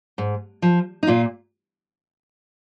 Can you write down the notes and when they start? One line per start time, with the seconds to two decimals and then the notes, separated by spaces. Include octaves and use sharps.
0.18 G#2
0.62 F3
1.03 D#4
1.07 A#2 F4